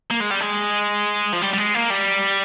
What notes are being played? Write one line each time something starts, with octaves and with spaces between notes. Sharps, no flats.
A#3
G#3
G3
G#3
F3
G3
G3
G#3
A#3
G3